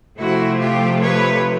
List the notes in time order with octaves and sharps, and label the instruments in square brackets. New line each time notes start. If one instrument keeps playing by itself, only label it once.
[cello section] C3 F3 A3 E4 F#4
F4 G4
B4 C#5